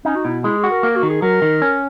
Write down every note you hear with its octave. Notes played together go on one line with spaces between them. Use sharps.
C#4 D#4
F#4
B2 E4
G#3 E4
G#4
F#4
A#4
A#3 A#4
F#4
D#3
G#4
F#3 A#4
D#3
C#4